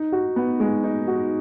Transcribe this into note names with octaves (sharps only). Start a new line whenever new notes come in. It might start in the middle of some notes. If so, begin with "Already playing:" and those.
Already playing: D#4
F#4
B3
G#3
D#4
F#4